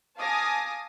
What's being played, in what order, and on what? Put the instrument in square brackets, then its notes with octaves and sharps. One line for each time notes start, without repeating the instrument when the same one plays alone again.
[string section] F5 G#5 A5 D6 D#6 A#6